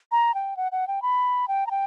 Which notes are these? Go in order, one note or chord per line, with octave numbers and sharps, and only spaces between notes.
A#5
G5
F#5
F#5
G5
B5
G5
A#5
G5